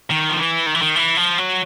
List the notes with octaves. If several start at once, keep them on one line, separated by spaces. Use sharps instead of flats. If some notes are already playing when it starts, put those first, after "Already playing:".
D#3
F3
E3
D#3
E3
D#3
E3
F3
F#3